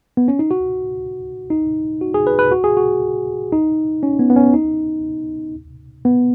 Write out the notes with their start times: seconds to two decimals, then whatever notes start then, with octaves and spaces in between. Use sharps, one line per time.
0.17 B3
0.28 C#4
0.39 D#4
0.51 F#4
1.50 D#4
2.01 F#4
2.14 G#4
2.27 B4
2.39 B4
2.51 F#4
2.64 G#4
2.77 F#4
3.52 D#4
4.03 C#4
4.19 B3
4.30 B3
4.36 C#4
4.54 D#4
6.05 B3